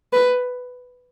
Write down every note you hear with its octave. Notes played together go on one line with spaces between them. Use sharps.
B4